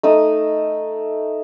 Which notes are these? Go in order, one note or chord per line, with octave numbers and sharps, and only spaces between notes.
A3 D#4 D#6